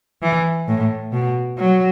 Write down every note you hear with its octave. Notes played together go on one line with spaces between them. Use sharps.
E3
A2
B2
F#3